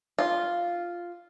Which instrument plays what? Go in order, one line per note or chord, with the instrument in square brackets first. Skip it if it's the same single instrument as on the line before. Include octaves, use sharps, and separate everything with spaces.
[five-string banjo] F4